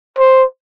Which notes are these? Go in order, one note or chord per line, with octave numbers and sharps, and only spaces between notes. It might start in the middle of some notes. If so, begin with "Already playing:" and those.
C5